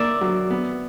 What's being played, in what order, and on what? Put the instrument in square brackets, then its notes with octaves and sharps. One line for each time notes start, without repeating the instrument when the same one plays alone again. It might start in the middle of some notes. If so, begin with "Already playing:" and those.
Already playing: [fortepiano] A#3 [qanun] D5 E5
[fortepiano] F#3
B3